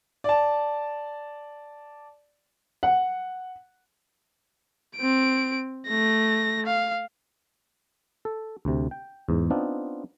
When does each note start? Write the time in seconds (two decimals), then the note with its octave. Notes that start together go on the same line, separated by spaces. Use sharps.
0.24 D5 A5
2.83 F#5
4.97 C4 D7
5.88 A3 A#6
6.66 F5
8.25 A4
8.65 D2 C3
8.91 G5
9.29 E2 G#2
9.50 B3 C4 D4 D#4 F4